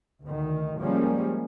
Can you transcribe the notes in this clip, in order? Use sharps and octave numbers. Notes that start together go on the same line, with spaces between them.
D2 D#3
F3 G3 G#3 A#3 C#4